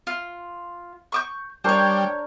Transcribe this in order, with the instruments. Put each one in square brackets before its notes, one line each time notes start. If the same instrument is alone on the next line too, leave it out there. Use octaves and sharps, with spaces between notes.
[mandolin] F4
C#6 D6 G6
[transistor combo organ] G3 [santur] D4 A#4 C#6 [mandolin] C5 C#5